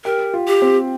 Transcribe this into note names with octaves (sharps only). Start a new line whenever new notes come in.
G4 A#4
F4
G4
C4